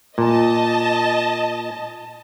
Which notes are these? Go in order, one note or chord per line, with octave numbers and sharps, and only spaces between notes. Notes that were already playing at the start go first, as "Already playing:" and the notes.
A#2 D#5 A5